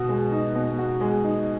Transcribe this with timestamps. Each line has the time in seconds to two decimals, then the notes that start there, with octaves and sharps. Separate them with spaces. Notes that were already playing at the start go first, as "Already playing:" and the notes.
Already playing: B2 F#4
0.09 G#3
0.32 D#4
0.55 B2
0.79 F#4
1.01 G#3
1.24 D#4